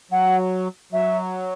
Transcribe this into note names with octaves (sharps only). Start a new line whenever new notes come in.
F#3 F#5
F#3 E5